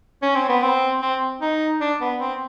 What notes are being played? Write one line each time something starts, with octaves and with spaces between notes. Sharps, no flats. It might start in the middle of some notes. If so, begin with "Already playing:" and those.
C#4
C4
B3
C4
C4
D#4
D4
B3
C4